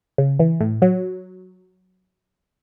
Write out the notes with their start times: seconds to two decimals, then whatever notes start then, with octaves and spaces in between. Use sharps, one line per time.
0.18 C#3
0.39 E3
0.61 A2
0.82 F#3